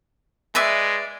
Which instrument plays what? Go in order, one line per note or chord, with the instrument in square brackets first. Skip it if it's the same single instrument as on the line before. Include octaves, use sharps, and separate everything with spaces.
[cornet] G#3 [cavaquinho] B4 D5 E5